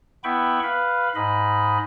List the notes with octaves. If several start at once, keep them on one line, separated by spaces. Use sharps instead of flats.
B3 E4 G5 B5 C#6
B4 F5 B5
G#2 D#5 B5